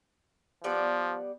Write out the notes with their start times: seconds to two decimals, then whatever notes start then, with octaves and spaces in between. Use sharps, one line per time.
0.64 F3 G3 B3 D5